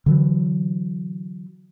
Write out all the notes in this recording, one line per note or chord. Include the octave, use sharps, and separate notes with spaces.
D3 E3 F#3